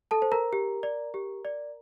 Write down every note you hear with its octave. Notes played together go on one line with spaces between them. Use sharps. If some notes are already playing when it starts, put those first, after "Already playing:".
A4 A5
C5
A#4 A#5
G4
D5
G4
D5